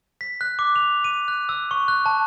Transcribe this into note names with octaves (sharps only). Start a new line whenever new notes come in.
B6
F#6
D6
F7
D#7
F#6
E6
C#6
F#6
A5